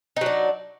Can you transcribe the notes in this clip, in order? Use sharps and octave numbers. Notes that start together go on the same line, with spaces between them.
F#3 D4 D#4